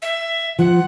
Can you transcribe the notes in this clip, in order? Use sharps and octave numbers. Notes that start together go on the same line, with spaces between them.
E5
F3 F#5